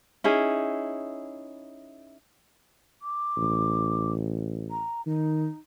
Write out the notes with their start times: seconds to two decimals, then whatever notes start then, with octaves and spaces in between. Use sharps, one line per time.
0.24 C#4 D#4 E4 G#4
3.02 D6
3.37 A1
4.71 A#5
5.06 D#3 D#4